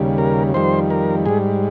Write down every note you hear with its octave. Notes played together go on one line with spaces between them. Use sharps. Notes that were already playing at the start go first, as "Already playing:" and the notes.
Already playing: D#2 C#3 G3
A#4
F2 D#3 G3 C5
A#4
G#2 G3 G#4